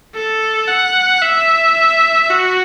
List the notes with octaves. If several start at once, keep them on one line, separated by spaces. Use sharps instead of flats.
A4
F#5
E5
F#4